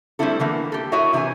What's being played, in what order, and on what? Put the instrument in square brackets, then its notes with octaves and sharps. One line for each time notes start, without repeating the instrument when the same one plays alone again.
[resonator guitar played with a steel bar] G3 A3 C4 D4 E4 A4
D3 E3 A#3 B3
G4 A4
E4 F#4 A#4 C#5 D#5 E5
C3 E3 E4 G#4 G#5